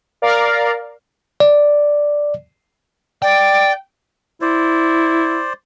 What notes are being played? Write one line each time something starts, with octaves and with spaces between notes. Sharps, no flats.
A#4 D5 F5
D5
D5 G5
E4 C5 D5